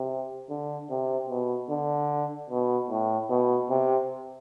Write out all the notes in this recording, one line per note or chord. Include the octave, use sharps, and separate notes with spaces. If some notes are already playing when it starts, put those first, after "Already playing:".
Already playing: C3
D3
C3
B2
D3
B2
A2
B2
C3